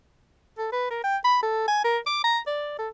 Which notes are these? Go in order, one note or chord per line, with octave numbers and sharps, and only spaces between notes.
A4
B4
A#4
G5
B5
A4
G#5
A#4
D6
A#5
D5
A4